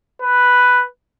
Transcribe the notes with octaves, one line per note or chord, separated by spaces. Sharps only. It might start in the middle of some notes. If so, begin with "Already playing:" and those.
B4